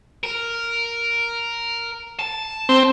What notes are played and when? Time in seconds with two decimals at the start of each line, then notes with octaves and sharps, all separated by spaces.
0.24 A#4
2.19 A5
2.69 C4